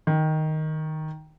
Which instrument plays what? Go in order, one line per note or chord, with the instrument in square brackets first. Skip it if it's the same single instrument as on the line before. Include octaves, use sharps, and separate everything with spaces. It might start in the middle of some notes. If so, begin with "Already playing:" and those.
[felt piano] D#3